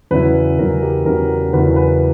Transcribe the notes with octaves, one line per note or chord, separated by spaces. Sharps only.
E2 C#3 F#3 C#4 E4 B4
E2 C#3 F#3 C#4 E4 A#4
G4
E2 C#3 F#3 C#4 E4 A#4
E2 C#3 F#3 C#4 E4 B4
B4